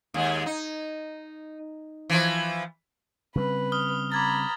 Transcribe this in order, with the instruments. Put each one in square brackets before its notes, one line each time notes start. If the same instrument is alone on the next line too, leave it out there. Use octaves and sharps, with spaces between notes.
[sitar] D#2 G#3
D#4
E3 F3
[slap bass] C#3 G3 C4 [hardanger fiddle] B4
[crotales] D#6 F6 G7
[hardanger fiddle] A#5 B5 [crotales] D6 G#6 A6